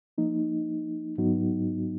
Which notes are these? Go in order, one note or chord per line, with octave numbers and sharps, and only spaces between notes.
F3 A#3 D#4
G#2 F#3 B3 D#4 F#4